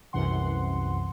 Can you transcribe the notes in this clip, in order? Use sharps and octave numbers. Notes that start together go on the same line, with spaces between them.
C2 F#2 C3 E3 F#5 C6